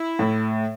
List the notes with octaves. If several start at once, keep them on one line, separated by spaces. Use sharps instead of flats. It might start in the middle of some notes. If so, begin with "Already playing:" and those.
Already playing: E4
A2